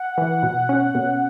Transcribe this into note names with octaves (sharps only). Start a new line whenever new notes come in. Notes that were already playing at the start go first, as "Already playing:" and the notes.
Already playing: F#5
E3
B2
C#4
B2